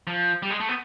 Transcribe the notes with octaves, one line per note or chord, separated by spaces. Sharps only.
F3
G3
G#3
A3
B3